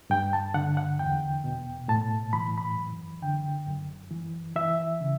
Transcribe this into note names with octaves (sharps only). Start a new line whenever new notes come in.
G2 G5
A5
D3 F#5
F#5
E2 G5
B2
A2 A5
E3 B5
B5
F#2
D3 G5
F#2
E3
E3 E5
C#3